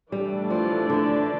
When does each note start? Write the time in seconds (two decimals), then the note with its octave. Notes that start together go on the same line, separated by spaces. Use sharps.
0.12 E3 G3 A3 D4 A4 D5
0.50 F3
0.90 D3